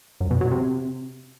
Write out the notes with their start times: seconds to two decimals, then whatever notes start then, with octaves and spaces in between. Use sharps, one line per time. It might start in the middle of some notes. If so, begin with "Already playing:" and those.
0.21 F#2
0.31 B2
0.41 F#3
0.51 C3